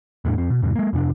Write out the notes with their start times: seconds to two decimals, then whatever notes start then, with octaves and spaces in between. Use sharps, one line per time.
0.25 E2 A2 A3 D4
0.38 F2 C4
0.50 B2
0.62 E2 G#2 C3
0.76 G#3 A#3
0.93 F2 C3 C#4 D4